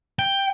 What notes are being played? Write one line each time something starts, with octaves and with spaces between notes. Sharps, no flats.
G5